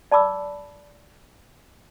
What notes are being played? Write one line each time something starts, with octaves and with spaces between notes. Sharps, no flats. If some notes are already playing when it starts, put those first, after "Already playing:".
D5 A5 B5 D6 E6